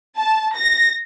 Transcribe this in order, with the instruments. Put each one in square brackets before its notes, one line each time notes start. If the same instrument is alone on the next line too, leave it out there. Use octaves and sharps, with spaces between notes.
[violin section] A5
A#6